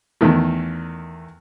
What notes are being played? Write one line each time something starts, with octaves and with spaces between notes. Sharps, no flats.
E2 D#3 A3